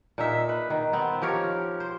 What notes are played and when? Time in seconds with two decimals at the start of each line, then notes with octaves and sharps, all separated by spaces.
0.18 A#2 D#4 E5
0.49 B4
0.70 D#3
0.93 B3 C4
1.22 F3 G4 A#4 C#5
1.80 C5